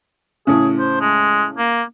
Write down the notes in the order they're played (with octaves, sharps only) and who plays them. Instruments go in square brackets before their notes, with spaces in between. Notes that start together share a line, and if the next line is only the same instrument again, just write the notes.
[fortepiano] A2 C#3 [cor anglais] G#4
[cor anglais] C5
G#3
A#3